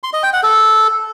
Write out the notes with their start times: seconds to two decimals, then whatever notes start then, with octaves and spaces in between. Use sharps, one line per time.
0.03 C6
0.13 D#5
0.23 G5
0.33 F#5
0.43 A4